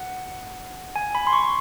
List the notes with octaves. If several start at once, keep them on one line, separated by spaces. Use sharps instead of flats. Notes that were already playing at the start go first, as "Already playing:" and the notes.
Already playing: F#5
G#5
B5
C6
C#6